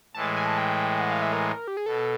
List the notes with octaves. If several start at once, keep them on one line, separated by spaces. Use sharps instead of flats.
A2 E3 G#3 A5
G#5
A5
G5
F#5
F5
E5
A#4
G4
G#4
B2 A4